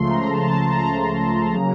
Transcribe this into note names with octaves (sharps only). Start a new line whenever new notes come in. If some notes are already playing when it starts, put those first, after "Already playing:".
Already playing: C#2 C#3 F3 A3 C6
A#5
A5
A5
A#5
C#3 F#3 A#3